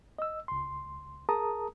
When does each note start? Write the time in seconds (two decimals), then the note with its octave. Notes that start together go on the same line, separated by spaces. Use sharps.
0.19 D#5 E6
0.48 C#2 C6
1.29 G#4 A#4 A5 A#5 D#6